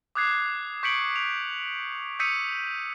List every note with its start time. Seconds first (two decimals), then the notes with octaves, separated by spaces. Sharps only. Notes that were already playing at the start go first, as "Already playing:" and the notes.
0.15 D6 D#6 F#6 G#6 C7
0.83 C#6 G6 B6 C#7 D7 F#7
1.16 F7
2.19 D#6 E6 G6 B6 C#7 D#7